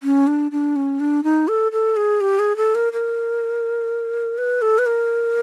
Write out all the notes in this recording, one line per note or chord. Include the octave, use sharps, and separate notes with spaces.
C#4
D4
D4
C#4
D4
D#4
A4
A4
G#4
G4
G#4
A4
A#4
A#4
B4
A4
B4
A#4